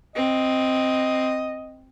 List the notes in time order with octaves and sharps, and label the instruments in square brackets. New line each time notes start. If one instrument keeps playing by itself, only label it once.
[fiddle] C4 [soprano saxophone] D#5